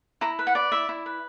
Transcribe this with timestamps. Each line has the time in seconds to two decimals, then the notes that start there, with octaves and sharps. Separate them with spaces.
0.21 E4 A#5
0.39 B4
0.47 F#5
0.55 D5
0.72 E4 E5
0.89 E4
1.06 B4